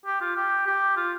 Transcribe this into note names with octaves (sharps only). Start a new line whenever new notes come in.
G4
F4
G4
G4
F4